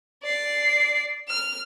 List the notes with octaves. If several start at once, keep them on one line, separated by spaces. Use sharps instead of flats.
D5 C7
F6